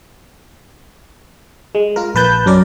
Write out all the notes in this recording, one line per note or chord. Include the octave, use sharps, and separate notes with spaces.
G#3
F4 A#4
A#1 B4 A5 G6
F#2 C#4 A#4 D5